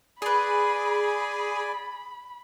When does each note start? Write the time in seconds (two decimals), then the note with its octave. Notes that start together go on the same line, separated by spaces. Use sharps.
0.22 G#4 B4 D5 G#5 B5 C6